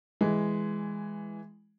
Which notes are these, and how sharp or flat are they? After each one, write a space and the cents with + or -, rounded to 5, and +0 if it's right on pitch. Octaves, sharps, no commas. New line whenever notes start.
E3 +0 G#3 +0